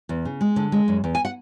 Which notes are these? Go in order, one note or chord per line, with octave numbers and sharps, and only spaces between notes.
E2
C#3
G#3
D3
G#3
F#2
E2
G#5
F#5